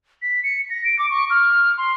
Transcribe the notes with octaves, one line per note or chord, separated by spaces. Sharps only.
B6
C#7
A#6
D7
D6
C#6
F6
C6